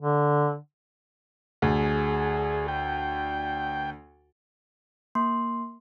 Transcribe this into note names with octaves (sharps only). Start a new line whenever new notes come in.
D3
D2 G#4
G5
A#3 C6